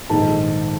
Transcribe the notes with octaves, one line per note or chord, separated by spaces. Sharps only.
A#1 G#2 D#3 A4 A5